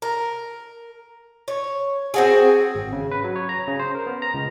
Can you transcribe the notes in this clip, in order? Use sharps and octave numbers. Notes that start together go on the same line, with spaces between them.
A#4
C#5
C4 F#4 G#4
G#1
C#3
B4
F#3
C#5
A#5
C#3
C5
A#4
B3
A#5
C#2